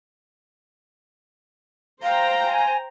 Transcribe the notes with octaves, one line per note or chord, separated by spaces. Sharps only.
C5 F5 G5 A#5
G#5